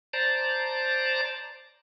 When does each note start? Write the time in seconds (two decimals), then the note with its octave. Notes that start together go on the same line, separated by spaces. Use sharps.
0.13 C5 D5 A5 A#5